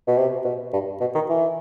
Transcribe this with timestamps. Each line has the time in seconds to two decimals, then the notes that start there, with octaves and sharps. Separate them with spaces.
0.08 B2
0.18 C3
0.45 B2
0.73 G2
1.01 B2
1.15 D#3
1.29 E3